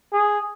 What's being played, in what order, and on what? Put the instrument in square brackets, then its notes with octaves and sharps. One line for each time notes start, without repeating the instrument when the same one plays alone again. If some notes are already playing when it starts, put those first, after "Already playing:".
[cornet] G#4